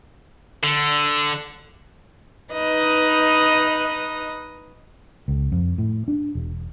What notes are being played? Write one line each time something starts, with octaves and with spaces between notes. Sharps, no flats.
D3
D#4 B4 D#5
C#2
F2
A2
D4
E1